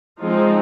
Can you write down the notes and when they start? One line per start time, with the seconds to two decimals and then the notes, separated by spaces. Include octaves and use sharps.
0.21 F3 G#3 C4 D#4 F4